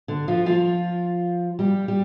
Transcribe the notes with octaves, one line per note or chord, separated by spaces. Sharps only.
D3
F3 F4
F3 F4
G3 G4
G3 G4